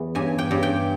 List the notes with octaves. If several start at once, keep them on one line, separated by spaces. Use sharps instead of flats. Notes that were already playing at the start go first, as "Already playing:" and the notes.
Already playing: E2 E3
G2 G#5
G5
G2
G5